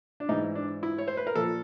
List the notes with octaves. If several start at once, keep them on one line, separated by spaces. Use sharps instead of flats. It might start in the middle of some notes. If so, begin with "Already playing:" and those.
D4
G#2 E3 D#4
D4
E4
C#5
C5
B4
A#4
A#2 F3 A4